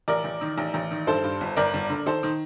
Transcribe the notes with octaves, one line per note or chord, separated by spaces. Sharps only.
A1 A#4 D5
A1
D#3
A1
A1
D#3
G2 A4 C5
G2
G1
G1 A#4 D5
G1
D3
D#3 A4 C5
D#3